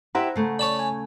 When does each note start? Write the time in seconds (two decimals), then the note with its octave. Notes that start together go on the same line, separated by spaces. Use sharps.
0.15 E4 G4 C5 E5 F#5 A#5
0.36 C#3 A3
0.59 C#5 D5 A5 B5
0.79 G#5